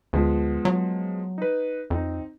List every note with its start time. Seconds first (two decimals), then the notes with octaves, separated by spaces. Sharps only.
0.13 D2 F3 G#3 B3
0.65 F#3
1.38 D#4 B4
1.90 F2 C4 D#4